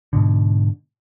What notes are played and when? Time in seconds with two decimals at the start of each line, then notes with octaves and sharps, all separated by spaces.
0.13 G#2 B2 D3